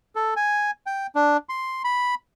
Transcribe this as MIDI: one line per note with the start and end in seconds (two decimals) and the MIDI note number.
0.15 0.34 69
0.36 0.71 80
0.86 1.07 79
1.15 1.37 62
1.49 1.82 84
1.84 2.15 83